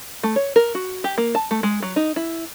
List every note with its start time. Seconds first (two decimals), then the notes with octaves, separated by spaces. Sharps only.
0.23 A3
0.36 C#5
0.56 A#4
0.75 F#4
1.04 G4
1.18 A#3
1.35 A5
1.51 A3
1.63 G#3
1.83 F#3
1.96 D#4
2.16 E4